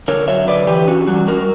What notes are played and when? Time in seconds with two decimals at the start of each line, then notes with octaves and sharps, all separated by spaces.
0.08 D3 A#4 C#5
0.28 F#3 C#5 E5
0.47 D3 B4 D5
0.67 E3 G4 B4
0.87 C#4 F#4
1.08 G3 F#4
1.27 G3 F#4 A#4